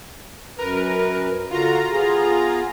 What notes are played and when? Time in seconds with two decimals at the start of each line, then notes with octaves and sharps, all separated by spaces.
0.58 F#2 A#4 B4
1.51 D3 F4 F#4 A#5
1.91 B3 G#4